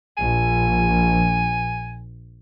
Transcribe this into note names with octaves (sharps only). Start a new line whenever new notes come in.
A#1 G#5